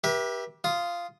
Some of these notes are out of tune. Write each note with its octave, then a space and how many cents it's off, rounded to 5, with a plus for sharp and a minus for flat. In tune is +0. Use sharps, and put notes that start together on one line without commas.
G4 +0 B4 -45 E5 +0
F4 -10 D#6 +0